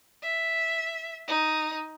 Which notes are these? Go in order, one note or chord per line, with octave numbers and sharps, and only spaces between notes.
E5
D#4